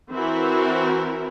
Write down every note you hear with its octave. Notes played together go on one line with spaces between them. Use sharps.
E3 C4 E4 F#4 A#4